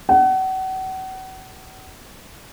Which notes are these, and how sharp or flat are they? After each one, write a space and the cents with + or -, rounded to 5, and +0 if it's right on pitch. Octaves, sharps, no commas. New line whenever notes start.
F#5 +35